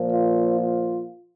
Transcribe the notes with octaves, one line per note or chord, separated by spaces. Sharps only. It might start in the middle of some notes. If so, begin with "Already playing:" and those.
Already playing: A#2 F3
F4
F4